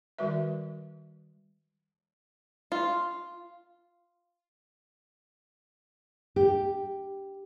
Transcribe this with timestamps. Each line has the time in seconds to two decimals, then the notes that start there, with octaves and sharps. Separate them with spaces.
0.19 D#3 G3 F#4 B4 E5
2.72 F4
6.36 G4